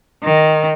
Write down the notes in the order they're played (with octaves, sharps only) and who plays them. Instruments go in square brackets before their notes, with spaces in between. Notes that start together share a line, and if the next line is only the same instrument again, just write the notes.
[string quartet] D#3